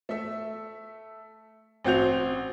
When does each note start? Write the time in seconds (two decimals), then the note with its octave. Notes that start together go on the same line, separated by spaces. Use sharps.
0.09 A3 E5
1.85 A1 C4 F#4 G6 F7